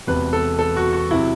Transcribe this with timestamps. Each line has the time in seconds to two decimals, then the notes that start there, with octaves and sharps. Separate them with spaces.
0.07 E1 E2 C3 B4
0.33 A4
0.59 A4
0.77 F#4
0.93 F#4
1.11 C3 F#3 E4